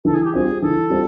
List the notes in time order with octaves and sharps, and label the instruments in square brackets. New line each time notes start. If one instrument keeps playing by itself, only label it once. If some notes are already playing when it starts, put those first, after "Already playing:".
[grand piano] E3 [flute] A4
[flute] G#4
G4
[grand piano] G3 C4 F4 [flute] G#4
[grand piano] E3 [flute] A4
[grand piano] G3 C4 F4